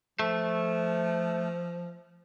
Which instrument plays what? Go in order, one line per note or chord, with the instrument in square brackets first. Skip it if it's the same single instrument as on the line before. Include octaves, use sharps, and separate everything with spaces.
[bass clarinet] F3 [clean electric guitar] A3